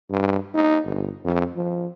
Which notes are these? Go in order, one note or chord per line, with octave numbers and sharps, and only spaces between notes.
G2
D#4
G1
F2
F3